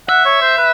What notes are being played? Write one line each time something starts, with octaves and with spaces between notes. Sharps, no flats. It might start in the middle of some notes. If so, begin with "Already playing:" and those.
E5 F#5
C#5
C5
B4